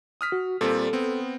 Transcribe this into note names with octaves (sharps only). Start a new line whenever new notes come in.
D#6 F6 B6
F#4
A#2 G3 C4 A4
B3 C4